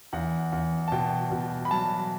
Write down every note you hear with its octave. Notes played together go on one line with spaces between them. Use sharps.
E2 F#5
E2
A5
B2 G5
B2
B5
F#3 A5